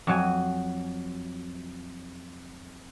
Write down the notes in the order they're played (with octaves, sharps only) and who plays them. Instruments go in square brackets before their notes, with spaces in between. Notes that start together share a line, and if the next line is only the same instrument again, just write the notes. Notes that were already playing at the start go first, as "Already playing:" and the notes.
[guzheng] F2 F#3 G#5